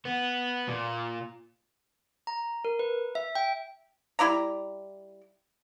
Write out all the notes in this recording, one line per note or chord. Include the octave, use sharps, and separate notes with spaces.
B3
A#2
A#5
A#4
B4
E5
G5
G3 E4 D5 A#5